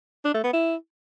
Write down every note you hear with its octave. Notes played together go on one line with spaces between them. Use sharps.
D4
A3
B3
E4